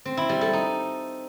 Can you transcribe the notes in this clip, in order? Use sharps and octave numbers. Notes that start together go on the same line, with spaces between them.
C4
E4
G3
A4
D#4